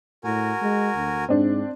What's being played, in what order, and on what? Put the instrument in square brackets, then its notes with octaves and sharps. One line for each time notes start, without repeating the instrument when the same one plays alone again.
[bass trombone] A2 [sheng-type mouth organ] F#4 A#4 G#5
[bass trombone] G#3
D2
[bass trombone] G#2 [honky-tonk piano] C4 D4